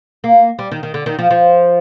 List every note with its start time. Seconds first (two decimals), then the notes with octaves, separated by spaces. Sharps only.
0.24 A#3
0.59 G3
0.72 D#3
0.83 D#3
0.94 D3
1.06 D#3
1.19 F3
1.30 F3